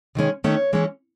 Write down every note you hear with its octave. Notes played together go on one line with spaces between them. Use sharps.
C3 D#3 G#3 C#4
D#3 A3 C#4 C#5
E3 G#3 C#4